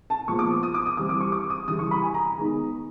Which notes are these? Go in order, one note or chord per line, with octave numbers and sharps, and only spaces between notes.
A5
A#2 F3 G#3 B3 C#6
D6
D#6
D#6
D6
D#6
E3 G3 C4 D6
D6
C#6
D6
D#6
C#3 E3 G3 D#6
C#6
B5
G#5
A#5
D#3 G#3 B3 D#4